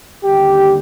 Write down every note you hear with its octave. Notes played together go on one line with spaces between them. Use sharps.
D#2 D3 G3 G4